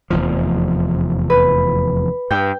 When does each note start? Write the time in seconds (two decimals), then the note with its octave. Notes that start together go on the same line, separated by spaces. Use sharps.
0.10 F1 E2 F3
1.30 B4
2.31 G2 G5